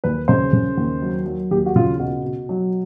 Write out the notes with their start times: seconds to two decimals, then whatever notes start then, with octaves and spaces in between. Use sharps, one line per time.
0.04 D#2 B4
0.28 C#3 C5
0.53 C#3
0.77 D#2
1.02 F#3
1.26 F#3
1.51 D#2 G4
1.66 F#4
1.76 C#3 F4
1.94 F4
1.99 B2 F#4
2.24 B2
2.49 F#3